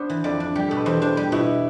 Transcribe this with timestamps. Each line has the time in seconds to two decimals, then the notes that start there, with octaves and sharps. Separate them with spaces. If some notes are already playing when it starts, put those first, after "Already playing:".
Already playing: B3 D4 C5
0.10 E3
0.24 F2 D5
0.40 D4
0.55 G3 G4
0.69 B2 A4
0.77 B4
0.85 E2 C5
1.02 D4 C5
1.17 G3 B4
1.32 B2 E4